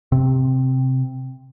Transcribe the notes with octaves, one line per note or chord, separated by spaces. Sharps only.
C3 C4